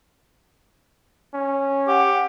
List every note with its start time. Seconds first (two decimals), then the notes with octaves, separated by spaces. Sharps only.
1.34 C#4
1.88 G4 F#5